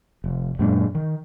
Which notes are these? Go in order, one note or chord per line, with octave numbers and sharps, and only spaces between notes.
F1
F#2 A#2 G#3 D4
D#3